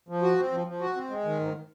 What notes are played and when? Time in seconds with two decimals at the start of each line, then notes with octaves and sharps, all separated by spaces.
0.09 F3
0.22 F#4
0.38 C4
0.52 F3
0.67 F3
0.81 F#4
0.95 C4
1.10 G#3
1.25 D#3
1.40 G#2